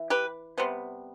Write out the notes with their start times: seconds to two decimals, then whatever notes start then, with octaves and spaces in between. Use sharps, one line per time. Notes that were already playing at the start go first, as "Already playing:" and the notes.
Already playing: E3
0.10 G4 B4
0.58 C3 G3 B3 C5